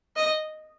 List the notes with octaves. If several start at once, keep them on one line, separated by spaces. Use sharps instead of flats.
D#5